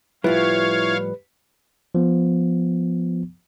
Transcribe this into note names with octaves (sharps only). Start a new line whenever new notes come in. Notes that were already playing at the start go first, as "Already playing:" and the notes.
A2 F3 G3 E4 F4 B4 C#5 F5
F3 B3